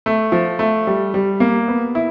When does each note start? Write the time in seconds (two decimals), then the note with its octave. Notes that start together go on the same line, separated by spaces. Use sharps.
0.06 A3
0.32 F3
0.59 A3
0.87 G3
1.14 G3
1.40 A#3
1.68 B3
1.95 E4